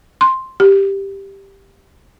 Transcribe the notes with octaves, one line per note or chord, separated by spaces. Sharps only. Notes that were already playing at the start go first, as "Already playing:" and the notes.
C6
G4